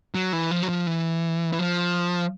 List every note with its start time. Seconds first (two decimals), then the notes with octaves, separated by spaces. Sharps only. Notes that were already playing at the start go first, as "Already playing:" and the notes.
0.15 F#3
0.33 E3
0.51 F3
0.63 F#3
0.69 F3
0.87 E3
1.53 E3
1.59 F3